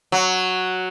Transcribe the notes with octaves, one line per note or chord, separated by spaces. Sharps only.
F#3